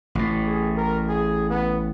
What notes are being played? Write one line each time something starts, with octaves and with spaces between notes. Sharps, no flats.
A1 A2
G#4
A#4
G#4
B3